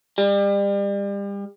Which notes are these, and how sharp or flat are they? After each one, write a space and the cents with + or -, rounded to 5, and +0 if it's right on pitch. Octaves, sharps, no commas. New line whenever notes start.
G3 +35